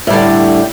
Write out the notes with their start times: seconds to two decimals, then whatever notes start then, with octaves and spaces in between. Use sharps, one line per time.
0.07 A2
0.10 G3
0.13 D3